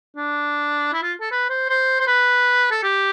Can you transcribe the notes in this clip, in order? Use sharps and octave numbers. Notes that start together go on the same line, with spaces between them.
D4
E4
F4
A4
B4
C5
C5
C5
B4
A4
G4